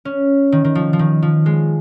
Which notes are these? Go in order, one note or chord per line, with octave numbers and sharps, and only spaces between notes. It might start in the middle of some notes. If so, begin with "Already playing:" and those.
C#4
D#3
D#3
F3
F3
D#3
F3
G#3